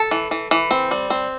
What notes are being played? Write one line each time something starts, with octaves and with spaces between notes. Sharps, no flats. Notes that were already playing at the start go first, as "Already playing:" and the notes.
Already playing: A4
E3
E3
E3
C4
G3
C4